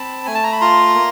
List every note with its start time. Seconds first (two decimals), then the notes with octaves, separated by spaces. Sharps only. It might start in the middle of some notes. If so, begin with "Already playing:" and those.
Already playing: C4 A5 B5
0.26 A3 G#5
0.35 A5
0.43 A#5
0.52 B5
0.61 F4 A#5 C6
0.95 A#3